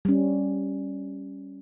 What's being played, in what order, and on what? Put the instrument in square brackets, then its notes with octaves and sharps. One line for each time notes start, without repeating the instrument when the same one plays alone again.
[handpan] G3 C#4